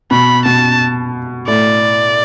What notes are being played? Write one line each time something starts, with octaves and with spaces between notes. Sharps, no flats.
B2 B5
B2 A5
A2 D5